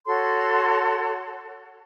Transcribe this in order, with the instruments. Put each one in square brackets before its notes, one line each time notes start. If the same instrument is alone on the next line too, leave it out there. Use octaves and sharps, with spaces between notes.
[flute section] F#4 A4 C#5 C6